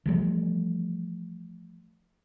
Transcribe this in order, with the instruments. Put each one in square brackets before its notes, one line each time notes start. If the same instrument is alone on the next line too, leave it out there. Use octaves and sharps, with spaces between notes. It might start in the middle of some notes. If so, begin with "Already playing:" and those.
[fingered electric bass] E3 F3 G3 A3